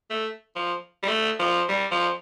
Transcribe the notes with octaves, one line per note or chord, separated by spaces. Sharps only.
A3
F3
G3
A3
F3
G3
F3